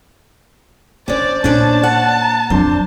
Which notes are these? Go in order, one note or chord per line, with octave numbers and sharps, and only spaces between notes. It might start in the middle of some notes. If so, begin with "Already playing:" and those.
E3 C#4 D4 C5 D5
A#2 A#3 C#4 D4 D5 A5
F#5
A#5
F2 F#3 D4 C5